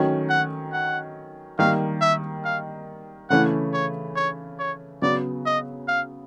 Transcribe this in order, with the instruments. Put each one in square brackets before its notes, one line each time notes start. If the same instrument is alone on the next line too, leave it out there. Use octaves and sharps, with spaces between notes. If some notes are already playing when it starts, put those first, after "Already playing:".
Already playing: [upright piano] D#3 F#3 A3 C#4
[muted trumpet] F#5
F#5
[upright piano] D#3 G3 A#3 [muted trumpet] F5
[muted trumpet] E5
F5
[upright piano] C#3 E3 A3 C#4 E4 [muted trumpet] F#5
[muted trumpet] C#5
C#5
C#5
[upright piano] C#3 F#3 B3 [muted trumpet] D5
[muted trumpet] D#5
F5